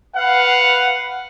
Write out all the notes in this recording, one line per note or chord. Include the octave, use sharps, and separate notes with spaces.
B4 F5 F#5